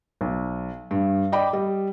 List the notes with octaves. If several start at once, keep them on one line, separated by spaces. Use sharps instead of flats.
B1
G2
D5 D#5 G5 B5 D6
G3 D#5